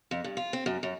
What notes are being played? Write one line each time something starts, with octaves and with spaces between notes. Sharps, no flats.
F2
G2
F4
C4
F#2
F#2